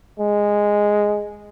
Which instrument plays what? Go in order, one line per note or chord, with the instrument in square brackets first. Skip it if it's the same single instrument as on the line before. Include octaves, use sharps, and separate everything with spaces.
[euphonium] G#3